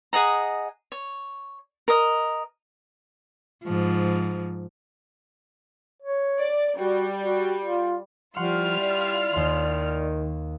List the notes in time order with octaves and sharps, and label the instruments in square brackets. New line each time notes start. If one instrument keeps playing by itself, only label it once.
[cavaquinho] G#4 D#5 F#5 A#5
C#5
A#4 D#5
[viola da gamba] G#2 F3
[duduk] C#5
[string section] D5
[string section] G3 [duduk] F#4
[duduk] F#4
F4
[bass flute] F3 [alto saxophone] G3 [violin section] E4 F4 F6 [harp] F#5 C6 C#6
[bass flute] D5
[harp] D#2 C6 [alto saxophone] D#3